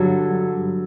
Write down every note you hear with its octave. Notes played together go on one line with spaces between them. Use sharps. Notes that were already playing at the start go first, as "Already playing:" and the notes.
Already playing: G2 D3 F#3